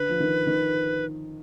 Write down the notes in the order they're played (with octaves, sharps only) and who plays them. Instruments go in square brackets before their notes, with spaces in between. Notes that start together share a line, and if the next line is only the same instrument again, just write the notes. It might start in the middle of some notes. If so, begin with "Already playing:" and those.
Already playing: [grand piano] D3 [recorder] B4
[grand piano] F3
D#3
D#3